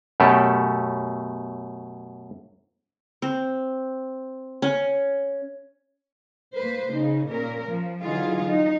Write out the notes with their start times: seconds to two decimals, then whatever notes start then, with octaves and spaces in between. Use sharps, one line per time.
0.20 F#2 B2 A3 C#4 G4 A4
3.22 C4
4.62 C#4
6.55 A#3 B4 C5
6.89 C#3 D#4
7.26 A#2 C#4 A#4
7.65 F3
8.01 D3 E3 F#3 D#4 F4 G#4
8.45 D#4